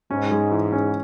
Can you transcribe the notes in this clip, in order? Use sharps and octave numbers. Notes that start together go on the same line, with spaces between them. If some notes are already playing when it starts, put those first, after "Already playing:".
G#2 C#4
G#3
E3
C#4